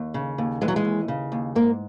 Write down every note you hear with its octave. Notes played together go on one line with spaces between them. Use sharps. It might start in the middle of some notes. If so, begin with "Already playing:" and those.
Already playing: D#2
C#3
D#2
E3 G#3
F#3
G#3
D#2
C#3
D#2
G#2 A#3